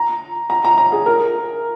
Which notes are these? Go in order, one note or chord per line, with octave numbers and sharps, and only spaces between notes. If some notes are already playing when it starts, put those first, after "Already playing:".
Already playing: A#5
A#5
A#5
A#5
G#4
A#4